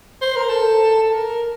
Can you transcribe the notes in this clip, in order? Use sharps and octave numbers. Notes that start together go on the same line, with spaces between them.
C5
A#4
A4
A4
A#4